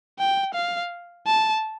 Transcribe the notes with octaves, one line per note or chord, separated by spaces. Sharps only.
G5
F5
A5